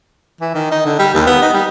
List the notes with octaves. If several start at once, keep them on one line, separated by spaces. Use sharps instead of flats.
E3
D#3
D#4
D3
G3
D#2
B3
D#4
G3